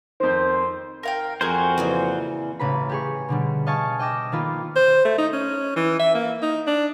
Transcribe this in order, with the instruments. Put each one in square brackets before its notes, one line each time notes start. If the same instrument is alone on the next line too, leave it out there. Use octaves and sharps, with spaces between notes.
[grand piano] F2 D#3 [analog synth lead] C5
[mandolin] A#4 F5 G5
[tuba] F2 [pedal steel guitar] F#4 C5 [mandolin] G#4 A#4
[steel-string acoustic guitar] A#2 C#3 E3
[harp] A1 C#3 B4 A#5 B5
G4 G#4 C#6
B2 D3 G3
D#5 F5 G#5 A5 C#6
D#5 G5 D6 E6 A#6
D#3 A#3 B3 F4 B4
[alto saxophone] C5
A3
D#4
C#4
E3
E5
A#3
D#4
D4